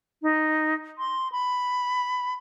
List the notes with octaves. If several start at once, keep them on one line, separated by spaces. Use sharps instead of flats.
D#4
C6
B5